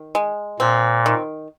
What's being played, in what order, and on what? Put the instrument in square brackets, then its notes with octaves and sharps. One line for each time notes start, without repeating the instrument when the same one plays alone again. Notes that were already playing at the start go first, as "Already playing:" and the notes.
Already playing: [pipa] D#3
G#3
[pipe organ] A#2 [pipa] C4
[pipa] D#3